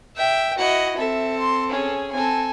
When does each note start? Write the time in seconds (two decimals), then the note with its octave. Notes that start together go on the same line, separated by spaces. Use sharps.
0.17 E5 G5
0.58 E4 F#4 D#5 F#5
0.98 C4 A4 E5
1.39 C6
1.69 C#4 G#4
2.13 C4 A4 G#5